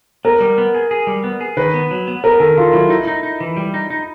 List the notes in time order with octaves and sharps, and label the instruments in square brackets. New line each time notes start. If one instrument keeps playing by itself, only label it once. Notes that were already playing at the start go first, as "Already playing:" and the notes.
[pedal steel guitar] B3 [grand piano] A#4
[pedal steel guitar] G3
B3
G#4
G#4
G3
B3
G#4
[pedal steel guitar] D#3 [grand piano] B4
[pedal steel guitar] B3
F#3
B3
[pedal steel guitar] B3 [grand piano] A#4
[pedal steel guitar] D#3 [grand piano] A4
[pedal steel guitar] D#3 [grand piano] F4
[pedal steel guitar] F#3 [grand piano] E4
[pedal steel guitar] D#4 [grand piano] E4
[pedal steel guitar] D#4
D#4
E3
G3
D#4
D#4